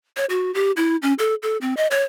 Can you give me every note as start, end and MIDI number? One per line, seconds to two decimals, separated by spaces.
0.17 0.25 73
0.30 0.53 66
0.54 0.71 67
0.77 0.96 64
1.02 1.13 61
1.19 1.35 69
1.43 1.57 69
1.61 1.74 60
1.77 1.87 75
1.91 2.04 73